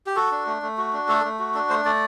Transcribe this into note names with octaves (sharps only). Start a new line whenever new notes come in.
G4
F#4 A4
D4
A3
A3
F#4
D4
A3 A4
A3
F#4
D4 A4
A3 C5
A3 D5